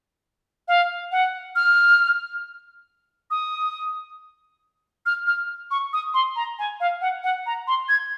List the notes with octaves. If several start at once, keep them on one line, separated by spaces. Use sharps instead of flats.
F5
F#5
F6
D#6
F6
F6
C#6
D#6
C6
A#5
G#5
F5
F#5
F#5
A#5
C6
G#6